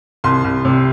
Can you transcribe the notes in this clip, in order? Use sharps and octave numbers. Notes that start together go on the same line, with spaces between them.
C2 C6
C2
C3